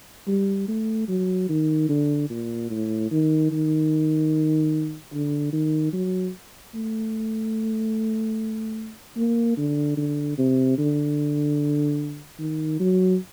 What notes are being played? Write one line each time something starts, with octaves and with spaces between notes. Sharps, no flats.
G3
A3
F#3
D#3
D3
A#2
A2
D#3
D#3
D3
D#3
F#3
A3
A#3
D3
D3
C3
D3
D#3
F#3